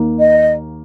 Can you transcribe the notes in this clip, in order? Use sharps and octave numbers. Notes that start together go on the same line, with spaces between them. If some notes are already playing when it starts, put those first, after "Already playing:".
Already playing: D#2 D#3 A#3 D#4
D#5